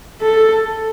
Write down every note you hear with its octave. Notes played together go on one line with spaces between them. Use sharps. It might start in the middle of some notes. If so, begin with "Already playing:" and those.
A4